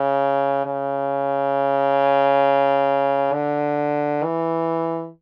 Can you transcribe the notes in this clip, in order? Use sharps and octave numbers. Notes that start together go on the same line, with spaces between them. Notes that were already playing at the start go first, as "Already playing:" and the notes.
Already playing: C#3
C#3
D3
E3